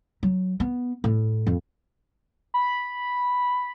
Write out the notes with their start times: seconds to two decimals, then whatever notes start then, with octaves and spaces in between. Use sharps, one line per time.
0.23 F#3
0.60 B3
1.04 A2
1.47 F2
2.54 B5